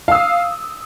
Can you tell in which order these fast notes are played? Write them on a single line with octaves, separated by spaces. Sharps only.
F5 E6 D#6